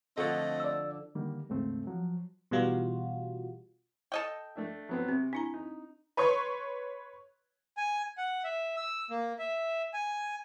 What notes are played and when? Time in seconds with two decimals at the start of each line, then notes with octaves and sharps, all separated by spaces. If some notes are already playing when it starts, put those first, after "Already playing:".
0.18 D3 F3 A3 C4 D#5 F#5
0.60 D5 E6
1.15 D3 D#3 G3 A#3
1.49 D#2 G#2 C#3 A3 C4
1.87 F3 F#3
2.51 B2 E3 G3 F4 F#4
4.12 A4 D#5 G5
4.56 A3 D4 E5
4.89 F#3 B3 C4
5.09 C3 C4
5.33 D4 E4 G#5 A#5
5.54 D#4
6.17 B4 C#5 C6 C#6
7.77 G#5
8.18 F#5
8.44 E5
8.77 E6
9.10 A#3
9.39 E5
9.93 G#5